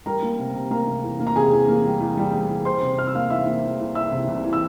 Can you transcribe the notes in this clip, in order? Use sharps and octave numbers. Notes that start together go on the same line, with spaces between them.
G3 A#4 A#5
A#3
C3
C3
A#3 A#4 A#5
C3
E2
A#3
A#5
C3 G#4 G#5
E2
A#3
G3
E2
G3
G3
E2
E3 C5 C6
C3
C3 F6
E6
A#3 F5 F6
E3 E5 E6
A#3
E3
C2
E3 E5 E6
C3
C2
E3
E6